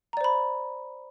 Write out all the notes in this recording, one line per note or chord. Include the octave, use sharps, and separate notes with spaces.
C5 D5 A#5 B5